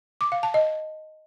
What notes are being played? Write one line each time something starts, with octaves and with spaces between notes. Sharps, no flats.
D6
F5
A5
D#5